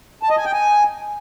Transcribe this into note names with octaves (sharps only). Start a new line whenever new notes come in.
A5
D#5
G#5
G5
G#5